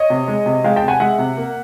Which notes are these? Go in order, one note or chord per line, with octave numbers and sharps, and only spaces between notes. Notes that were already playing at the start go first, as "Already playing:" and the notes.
Already playing: C#5 D#5
C3
G#3
C3
G#3 F5 G5
G5 A5
C3
F#5 G#5
G#3 E5 F#5
C3
A#3